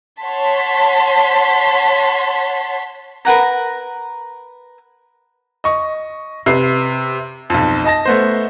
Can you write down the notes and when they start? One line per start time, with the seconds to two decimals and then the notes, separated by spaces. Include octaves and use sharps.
0.23 C#5 F#5 A5 C6 B6
3.25 A#4 B4 F#5 A#5
5.64 D#5 C#6
6.46 C3 B4 C7
7.50 B1 F2
7.84 D#5 A5 A#6
8.05 A3 B3 C5